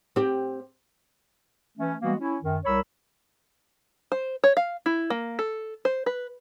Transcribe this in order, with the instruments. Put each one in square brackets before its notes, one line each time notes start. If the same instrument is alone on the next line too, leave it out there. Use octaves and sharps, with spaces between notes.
[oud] C4 G4
[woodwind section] E3 A3 C#4
E3 G3 G#3 A#3 B3 F#4
C#4 E4
F#2 D#3
C2 G3 A#4 C#5 B5 E6
[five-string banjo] C5
C#5
F5
E4
A#3
A4
C5
B4